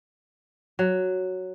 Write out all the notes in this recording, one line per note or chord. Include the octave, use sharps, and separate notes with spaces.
F#3